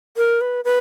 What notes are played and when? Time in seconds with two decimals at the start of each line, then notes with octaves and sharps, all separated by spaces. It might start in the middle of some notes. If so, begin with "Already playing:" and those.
0.17 A#4
0.41 B4
0.65 B4